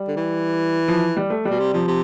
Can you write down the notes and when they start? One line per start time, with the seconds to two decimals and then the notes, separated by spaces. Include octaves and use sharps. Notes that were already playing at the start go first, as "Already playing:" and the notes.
Already playing: G3
0.08 D3
0.17 E3
0.88 F3
1.17 G3
1.30 A3
1.45 B2 G3
1.60 C3
1.74 C3 F3
1.88 C3